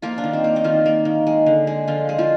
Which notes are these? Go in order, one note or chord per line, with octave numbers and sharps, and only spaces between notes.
F3 A#3 F4
D4
D#3
C4
A#3
D#4
D#3 F3 F4
A#3
D#3
G#3
D3
G#3
D3 F3 F4
G#3
F3 F4